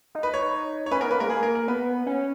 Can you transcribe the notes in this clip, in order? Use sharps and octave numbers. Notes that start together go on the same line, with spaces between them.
D#4
B4
C#5
C#5
C#4 B4
B3 A#4
A#3 B4
G#3 A#4
A#3 G#4
A#4
A#4
B3 B4
C#4